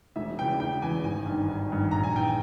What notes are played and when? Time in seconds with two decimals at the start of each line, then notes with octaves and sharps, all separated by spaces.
0.16 E1 E5
0.39 E2 C#3 E3 G5
0.59 E1 G5
0.82 E2 C#3 E3 G#5
1.03 G#1 G#5
1.26 G2 D#3
1.48 G#1
1.70 G2 D#3
1.91 A#1 A#5
2.03 G#5
2.13 G#2 E3 G5
2.27 G#5